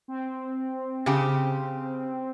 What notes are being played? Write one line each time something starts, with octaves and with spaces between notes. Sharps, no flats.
C4
C#3 G4